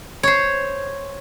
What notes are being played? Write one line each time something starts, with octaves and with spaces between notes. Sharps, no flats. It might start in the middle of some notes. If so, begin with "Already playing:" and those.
C5 C#5